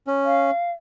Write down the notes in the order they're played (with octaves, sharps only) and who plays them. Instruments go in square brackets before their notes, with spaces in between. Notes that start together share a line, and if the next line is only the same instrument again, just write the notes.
[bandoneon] C#4
[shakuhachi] F5